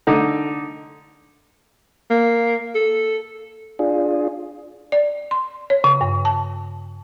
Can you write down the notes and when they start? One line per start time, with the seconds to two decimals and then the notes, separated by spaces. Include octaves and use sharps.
0.07 D3 D#4
2.10 A#3
2.75 A4
3.79 D4 F4 G#4
4.92 D5
5.31 C6
5.70 C#5
5.84 C#3
6.01 G2
6.25 A5